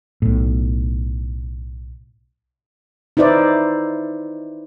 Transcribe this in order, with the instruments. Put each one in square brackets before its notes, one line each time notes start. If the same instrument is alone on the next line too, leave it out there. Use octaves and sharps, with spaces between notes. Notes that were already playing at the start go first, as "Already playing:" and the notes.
[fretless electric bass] B1 A2
[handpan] D#4 E4 B4 C5 D5